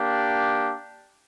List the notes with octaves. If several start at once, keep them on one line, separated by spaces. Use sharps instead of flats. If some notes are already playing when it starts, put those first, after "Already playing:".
Already playing: A#3 D4 G4